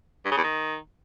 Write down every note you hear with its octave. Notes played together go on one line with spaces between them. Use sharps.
G2
C#3
E2
D#3